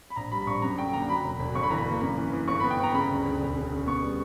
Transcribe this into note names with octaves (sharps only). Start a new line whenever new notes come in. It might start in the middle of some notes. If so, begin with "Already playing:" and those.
B5
A#1 A#5
G3 B5
B5
A#1 C#6
F#2 A#5
D3 G5
A#3 A#5
F#3 B5
E1
E1
G1 C#6
B5
E3 A#5
B5
A#3
F#2
E3
E3
G1 C#6
B3 B5
G5
G1 A#5
C#3 B5
D2
D2
E1
C#3
C#3
B3 C#6
G3